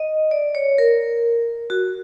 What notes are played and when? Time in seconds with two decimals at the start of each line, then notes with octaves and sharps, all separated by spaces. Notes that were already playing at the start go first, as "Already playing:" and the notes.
Already playing: D#5
0.31 D5
0.55 C#5
0.78 A#4
1.70 F#4